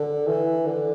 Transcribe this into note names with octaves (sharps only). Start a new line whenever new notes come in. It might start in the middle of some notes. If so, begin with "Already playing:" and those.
Already playing: D3
E3
D3